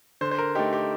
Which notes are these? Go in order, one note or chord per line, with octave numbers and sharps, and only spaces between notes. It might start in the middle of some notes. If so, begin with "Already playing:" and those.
D3 C5
C5
A#4
A3 D#4 G4
G4